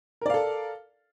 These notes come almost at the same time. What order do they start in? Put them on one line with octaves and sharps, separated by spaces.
A#4 D5 F5 A4